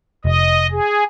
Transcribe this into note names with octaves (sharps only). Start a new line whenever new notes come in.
F1 D#5
G#4